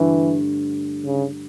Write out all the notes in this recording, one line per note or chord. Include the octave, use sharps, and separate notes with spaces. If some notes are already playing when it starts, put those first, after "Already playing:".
Already playing: G2 D3 E3 A3
C#3